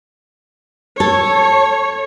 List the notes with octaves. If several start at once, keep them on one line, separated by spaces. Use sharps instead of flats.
A4 C#5